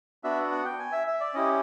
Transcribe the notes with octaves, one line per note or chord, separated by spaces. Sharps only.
B3 D4 F#4 E5
F#5
G5
G#5
E5
E5
D5
C#4 E4 G4 D#5